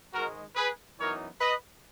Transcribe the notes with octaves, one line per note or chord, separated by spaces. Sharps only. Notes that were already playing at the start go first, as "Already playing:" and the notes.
G#2 D#3 G#3 D#4 F#4 A#4
G#4 B4
F#2 E3 B3 D#4 A#4 C#5
B4 D#5